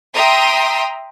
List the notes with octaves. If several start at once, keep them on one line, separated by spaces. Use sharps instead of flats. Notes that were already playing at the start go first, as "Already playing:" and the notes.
E5 G5 A#5 C6 D#6